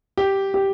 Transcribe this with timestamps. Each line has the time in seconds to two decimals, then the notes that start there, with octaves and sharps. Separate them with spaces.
0.17 G4
0.54 G4